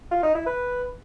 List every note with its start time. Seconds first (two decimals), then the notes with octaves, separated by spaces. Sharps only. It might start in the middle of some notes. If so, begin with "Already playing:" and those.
0.11 F4
0.23 D#4
0.35 E4
0.46 B4